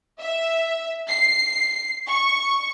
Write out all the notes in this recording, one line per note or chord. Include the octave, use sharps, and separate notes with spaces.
E5
C7
C#6